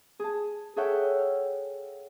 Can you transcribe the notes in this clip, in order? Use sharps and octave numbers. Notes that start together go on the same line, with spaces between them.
G#4 A5
G#4 A4 C#5 E5 F#5 G5
F6